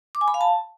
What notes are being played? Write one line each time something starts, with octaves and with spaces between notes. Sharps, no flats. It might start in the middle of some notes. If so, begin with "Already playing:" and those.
D6
G#5
B5
F5
A5